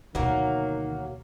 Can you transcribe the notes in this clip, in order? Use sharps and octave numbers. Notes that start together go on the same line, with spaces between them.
D2 B2 D#3 F#3 A#3